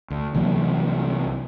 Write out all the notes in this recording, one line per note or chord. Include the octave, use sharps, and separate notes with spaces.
D2
C2 E3 F#3 A#3